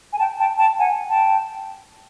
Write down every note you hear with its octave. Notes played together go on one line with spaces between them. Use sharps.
G#5
G5 A5
G5 A5
G5 A5
F#5 G#5
G5 A5